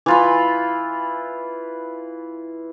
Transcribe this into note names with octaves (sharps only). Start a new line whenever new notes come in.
E3 F4 B5